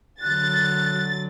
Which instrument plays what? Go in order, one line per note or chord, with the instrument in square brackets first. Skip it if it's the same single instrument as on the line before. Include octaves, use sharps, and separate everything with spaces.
[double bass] D3 F#3 [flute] F#6 [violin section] A6